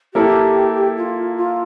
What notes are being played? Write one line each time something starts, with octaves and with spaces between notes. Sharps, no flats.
A#3 E4 G4 A4
F4
F4